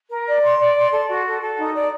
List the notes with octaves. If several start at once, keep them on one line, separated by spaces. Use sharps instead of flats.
A#4
D5
C6
D5
C6
A4
F#4
A4
A4
D#4
D5